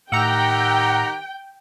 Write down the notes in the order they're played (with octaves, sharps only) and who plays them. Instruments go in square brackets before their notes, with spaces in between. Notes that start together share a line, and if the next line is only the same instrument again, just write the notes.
[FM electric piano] A2 E6 C#7 [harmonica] D#3 G4 [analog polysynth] F#5 A#5 [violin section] G5